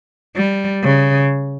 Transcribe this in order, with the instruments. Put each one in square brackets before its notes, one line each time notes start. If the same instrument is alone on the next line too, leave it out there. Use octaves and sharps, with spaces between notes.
[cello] G3
C#3